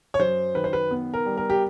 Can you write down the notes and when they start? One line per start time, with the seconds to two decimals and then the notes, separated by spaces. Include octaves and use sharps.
0.14 C#5
0.19 F#2 C5
0.55 D#3 B4
0.64 C5
0.73 B4
0.91 B3
1.14 A#4
1.26 G3
1.37 A#4
1.50 G4